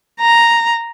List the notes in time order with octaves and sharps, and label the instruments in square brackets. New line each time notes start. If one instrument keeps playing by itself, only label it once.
[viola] A#5